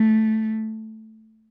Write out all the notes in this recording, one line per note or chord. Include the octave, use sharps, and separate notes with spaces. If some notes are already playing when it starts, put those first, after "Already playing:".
Already playing: A3